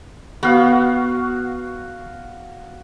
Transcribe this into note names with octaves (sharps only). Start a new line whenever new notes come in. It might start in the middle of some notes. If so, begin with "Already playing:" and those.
B3 F#4 F5